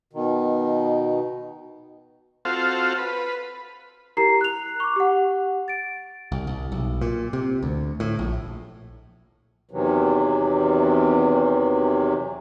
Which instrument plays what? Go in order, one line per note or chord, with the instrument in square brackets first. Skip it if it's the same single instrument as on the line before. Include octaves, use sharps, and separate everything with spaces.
[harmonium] B2 D#3
[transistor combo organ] C4 F4 F#4 A4 C5 F5
B4
[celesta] E4 G4 A#4 A#5 C7
F#6 F7
C#6 D6
G4 F#5
A6 D7
[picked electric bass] C2
C2
B1
A#2
C3
D2
A2
A#1
[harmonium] E2 C3 D#3 E3 F#3